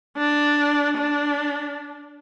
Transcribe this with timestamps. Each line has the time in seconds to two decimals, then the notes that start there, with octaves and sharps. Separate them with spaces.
0.17 D4
0.97 D4